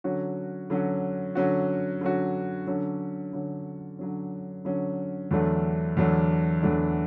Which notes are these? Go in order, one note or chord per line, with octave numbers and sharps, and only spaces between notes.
D3 F#3 C#4 F#4
D3 F#3 C#4 F#4
D3 F#3 C#4 F#4
D3 F#3 C#4 F#4
D3 F#3 C#4
D3 F#3 C#4
D3 F#3 C#4
D3 F#3 C#4
E2 D3 F#3 A3 D4
E2 D3 F#3 A3 D4
E2 D3 F#3 A3 D4